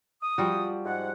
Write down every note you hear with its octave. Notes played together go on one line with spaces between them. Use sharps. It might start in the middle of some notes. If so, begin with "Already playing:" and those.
D#6
F3 G3 F#4
G#2 F#5